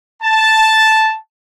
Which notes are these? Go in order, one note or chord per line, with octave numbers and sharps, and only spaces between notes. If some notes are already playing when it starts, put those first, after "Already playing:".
A5